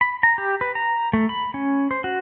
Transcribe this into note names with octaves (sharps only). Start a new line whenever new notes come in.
B5
A#5
G4
B4
A#5
A3
B5
C#4
C5
F#4